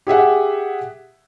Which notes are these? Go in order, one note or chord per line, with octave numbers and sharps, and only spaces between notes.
G4 G#4 E5 F#5